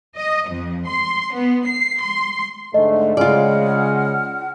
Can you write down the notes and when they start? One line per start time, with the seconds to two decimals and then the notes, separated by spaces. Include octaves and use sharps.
0.16 D#5
0.49 F2
0.87 C6
1.34 B3
1.66 C7
2.02 C6
2.74 G#2 D3 A3 D#5
3.17 C#3 G#3 F4 D5 F#5 F6